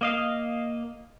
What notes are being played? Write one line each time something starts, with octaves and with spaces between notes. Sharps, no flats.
A#3 D#5 F5